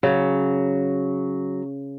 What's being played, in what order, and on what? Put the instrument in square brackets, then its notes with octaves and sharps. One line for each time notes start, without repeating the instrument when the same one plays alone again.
[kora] C#3 [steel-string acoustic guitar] F#3